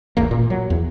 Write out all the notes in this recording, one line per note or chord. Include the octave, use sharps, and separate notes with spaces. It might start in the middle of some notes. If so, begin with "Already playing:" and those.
E1 A1 E2 A#3
A#2
F#3
E2